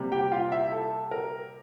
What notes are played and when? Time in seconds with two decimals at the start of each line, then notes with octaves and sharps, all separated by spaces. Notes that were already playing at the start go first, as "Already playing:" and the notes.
Already playing: C3 G3 A#3
0.12 G4 G5
0.32 F4 F5
0.52 E4 E5
0.72 A4
1.11 A#4